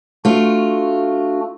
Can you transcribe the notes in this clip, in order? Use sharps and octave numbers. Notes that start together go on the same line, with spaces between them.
A3 D4 F4 F#4